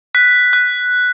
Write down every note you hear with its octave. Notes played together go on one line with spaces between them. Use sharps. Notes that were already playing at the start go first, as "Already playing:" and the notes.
F#6 B6
F#6